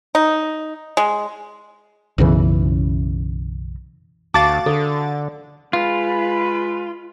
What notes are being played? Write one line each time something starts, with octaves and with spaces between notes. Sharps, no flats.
D#4
G#3
B1 F#2 C#3 E3
D2 F#4 F5 A5 D6 A6
D3 A4
G#3 F4 B4 B5